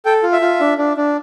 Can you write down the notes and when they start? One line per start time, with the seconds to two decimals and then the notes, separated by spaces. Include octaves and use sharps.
0.05 A4 G5
0.23 F4
0.33 E5
0.41 F4
0.60 D4
0.78 D4
0.97 D4